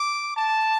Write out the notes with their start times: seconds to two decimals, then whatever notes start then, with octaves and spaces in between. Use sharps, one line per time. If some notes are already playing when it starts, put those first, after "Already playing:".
Already playing: D6
0.37 A5